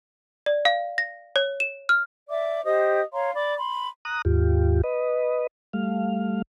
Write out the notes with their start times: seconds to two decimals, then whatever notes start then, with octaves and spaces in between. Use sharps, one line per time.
0.46 D5
0.65 F5
0.98 A#6
1.36 C#5
1.60 E7
1.89 F6
2.29 D5 E5 D6
2.64 G4 C5 D#5 D#6
3.12 C#5 F5 A#5 C6
3.34 D5 B5 D6
3.56 B5 C6
4.05 A#5 D#6 F#6
4.25 D#2 G#2 F4 G4
4.84 B4 D#5
5.73 G3 A3 F5